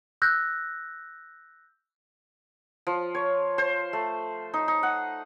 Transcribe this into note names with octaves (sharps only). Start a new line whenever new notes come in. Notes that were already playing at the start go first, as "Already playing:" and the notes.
E6 F#6 G6 A#6
F3
C#5
C5
A3
D#4
D#4
F#5